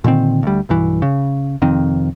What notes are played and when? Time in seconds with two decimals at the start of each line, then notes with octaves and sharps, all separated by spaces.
0.04 A#2 D3 D#3 C4
0.43 D2 G3
0.69 B1 G2 E3
1.02 C#3
1.62 F1 F2 D#3 C4